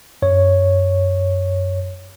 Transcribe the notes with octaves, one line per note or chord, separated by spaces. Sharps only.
F#2 C#5